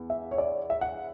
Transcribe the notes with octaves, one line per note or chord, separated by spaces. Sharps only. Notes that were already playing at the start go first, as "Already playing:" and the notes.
Already playing: E2
E5
C#5
D5
E5
F#5